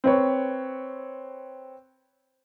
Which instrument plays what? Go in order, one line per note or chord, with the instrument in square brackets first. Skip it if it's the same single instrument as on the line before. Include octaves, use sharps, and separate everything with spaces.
[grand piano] C4 B4 C#5